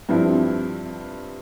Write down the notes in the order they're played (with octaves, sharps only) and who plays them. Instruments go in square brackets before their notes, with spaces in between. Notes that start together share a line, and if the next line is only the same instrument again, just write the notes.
[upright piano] G2 F3 C4 E4